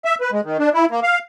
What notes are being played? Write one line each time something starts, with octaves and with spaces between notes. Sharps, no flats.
E5
B4
G#3
D#3
D4
E4
A#3
F5